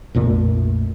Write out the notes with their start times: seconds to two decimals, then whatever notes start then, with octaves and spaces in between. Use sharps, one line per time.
0.15 A#1 F2 A#2 A3